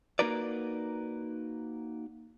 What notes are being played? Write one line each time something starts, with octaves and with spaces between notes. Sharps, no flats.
A#3 D#4 F#4 A#4 B4 D5